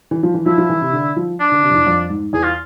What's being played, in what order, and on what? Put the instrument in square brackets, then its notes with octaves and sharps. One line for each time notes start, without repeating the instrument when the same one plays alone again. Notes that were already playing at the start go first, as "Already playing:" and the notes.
[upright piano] E3
F3
E3
[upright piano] F3 [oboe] E4
[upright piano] F3
E3
C3
D3
F3
[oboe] D4
[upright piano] D3
C3
F2
E2
F2
G#2
[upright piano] E2 [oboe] G#4
[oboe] F4